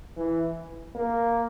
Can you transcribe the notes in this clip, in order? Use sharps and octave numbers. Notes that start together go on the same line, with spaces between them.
E3
A#3